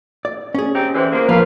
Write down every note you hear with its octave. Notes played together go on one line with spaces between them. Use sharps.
D5
C#4 G#4
C4 D#4 G4
D3 E3 C5
F3 G#3 A#3
F3 A#3 A#4 B4 F5